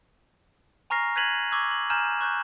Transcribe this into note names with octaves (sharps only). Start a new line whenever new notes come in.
G#5 A#5 C#6 F6 A#6 C7
F#6 G#6 B6 D#7 F7 F#7
C#6 D6 E6 G#6
F#7
G#5 A#5 F6 G6 E7
C#6 F#6 G6